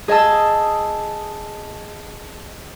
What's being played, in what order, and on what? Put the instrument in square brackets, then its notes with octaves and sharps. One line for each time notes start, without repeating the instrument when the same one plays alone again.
[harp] G#4 D#5 G#5 A5 E6